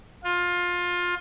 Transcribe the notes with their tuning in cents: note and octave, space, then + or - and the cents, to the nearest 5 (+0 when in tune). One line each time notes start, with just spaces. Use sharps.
F4 +20